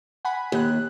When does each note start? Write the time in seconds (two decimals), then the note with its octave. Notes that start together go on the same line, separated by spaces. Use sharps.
0.25 F#5 G#5 B5
0.52 D#2 G4 F#6